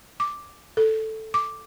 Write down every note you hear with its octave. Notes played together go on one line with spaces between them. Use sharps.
D6
A4
D6